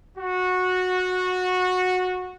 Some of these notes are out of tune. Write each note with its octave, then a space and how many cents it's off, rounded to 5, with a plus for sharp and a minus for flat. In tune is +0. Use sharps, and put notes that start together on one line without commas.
F#4 -15